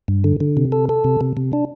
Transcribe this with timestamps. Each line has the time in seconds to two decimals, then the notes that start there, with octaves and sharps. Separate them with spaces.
0.08 G2
0.24 D3
0.40 D3
0.57 C3
0.72 A4
0.89 A4
1.04 C3
1.21 C3
1.37 C3
1.53 D4